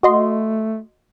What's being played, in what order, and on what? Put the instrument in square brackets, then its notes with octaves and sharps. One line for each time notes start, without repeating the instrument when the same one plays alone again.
[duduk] A3 [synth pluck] F#4 D#5 C6